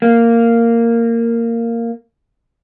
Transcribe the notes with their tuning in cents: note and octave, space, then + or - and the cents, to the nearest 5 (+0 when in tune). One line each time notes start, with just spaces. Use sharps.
A#3 -10